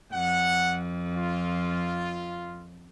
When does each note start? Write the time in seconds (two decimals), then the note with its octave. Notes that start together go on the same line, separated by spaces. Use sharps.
0.13 F2 F#5
1.15 F4